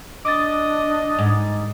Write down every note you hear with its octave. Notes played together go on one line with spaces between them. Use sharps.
D4 D#5 D6 D#6 A6
G#2